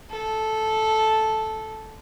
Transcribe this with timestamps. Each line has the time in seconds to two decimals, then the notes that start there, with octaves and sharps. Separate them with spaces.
0.10 A4